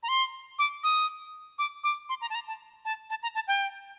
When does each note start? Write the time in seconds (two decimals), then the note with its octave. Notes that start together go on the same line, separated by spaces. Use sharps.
0.03 A#5
0.08 C6
0.59 D6
0.84 D#6
1.59 D6
1.84 D6
2.09 C6
2.21 A#5
2.30 A5
2.35 A#5
2.48 A5
2.85 A5
3.10 A5
3.23 A#5
3.35 A5
3.48 G5